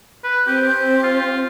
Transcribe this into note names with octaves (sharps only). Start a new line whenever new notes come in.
B4
C4 G4
F4